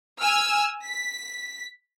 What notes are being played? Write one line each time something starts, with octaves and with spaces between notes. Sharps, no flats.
G#5 E6 F6
B6